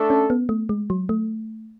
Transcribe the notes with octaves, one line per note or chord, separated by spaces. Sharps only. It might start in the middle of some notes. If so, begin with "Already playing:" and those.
Already playing: A3 D4 A4
C#4
B3
A3
G#3
F#3
A3